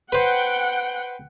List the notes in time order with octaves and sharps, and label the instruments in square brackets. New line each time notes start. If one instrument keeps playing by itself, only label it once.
[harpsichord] B4 C5 [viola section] F#5 G5